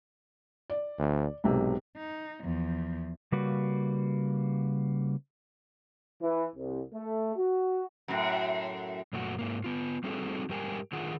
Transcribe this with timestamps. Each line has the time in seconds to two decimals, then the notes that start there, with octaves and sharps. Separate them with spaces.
0.70 D5
0.99 D2
1.44 B1 G#2 C3
1.97 D#4
2.43 E2 F3
3.32 C#3 G3 A#3 F#4 B4
6.21 E3
6.56 C2
6.93 A3
7.36 F#4
8.08 F#2 A2
9.13 F#2 A#2 A3 F#4
9.39 G#2 A#3
9.64 B3 F4
10.04 G3 C4 D#4 F#4 G#4 A4
10.49 G#2 G3 G4 A#4 G5 G#5
10.93 D3 D#3 F4 G#4 F#5